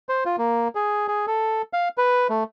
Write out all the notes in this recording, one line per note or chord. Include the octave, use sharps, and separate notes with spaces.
C5
F4
A#3
G#4
G#4
A4
F5
B4
A3